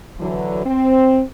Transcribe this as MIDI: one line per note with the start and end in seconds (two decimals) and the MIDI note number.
0.20 0.64 50
0.20 0.64 52
0.20 0.64 54
0.65 1.21 60